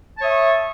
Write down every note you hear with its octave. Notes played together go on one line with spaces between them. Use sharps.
C#5 E5 A5 C#6 D#6